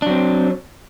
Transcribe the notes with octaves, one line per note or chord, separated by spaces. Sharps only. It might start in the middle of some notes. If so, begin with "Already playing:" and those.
F#3 C4 D4